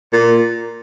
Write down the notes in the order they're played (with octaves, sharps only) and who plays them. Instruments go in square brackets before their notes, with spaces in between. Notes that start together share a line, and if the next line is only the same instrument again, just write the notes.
[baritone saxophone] A#2